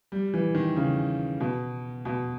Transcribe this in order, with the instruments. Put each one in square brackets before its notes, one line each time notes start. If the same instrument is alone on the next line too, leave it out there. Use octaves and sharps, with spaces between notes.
[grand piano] G3
E3
D#3
C#3
B2
B2